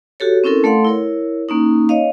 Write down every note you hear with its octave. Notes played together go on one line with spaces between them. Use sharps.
F#4 G4 A4 C#5
C4 C#4 E4 A4 A#4
A3 A4 D5 F5 F#5 C6
E4 A#4 C#5
A#3 C#4 D#4
C#5 D#5 F5